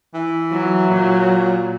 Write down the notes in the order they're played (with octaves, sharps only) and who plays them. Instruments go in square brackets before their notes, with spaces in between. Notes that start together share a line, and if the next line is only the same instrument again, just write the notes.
[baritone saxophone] E3
[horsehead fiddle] F#3
[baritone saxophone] A#2